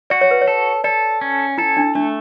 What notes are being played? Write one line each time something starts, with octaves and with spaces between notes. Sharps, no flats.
F#4 D5
C#5
B4
C#5
A4
A4 D5
C#4
E4 A4
D4
A3 D4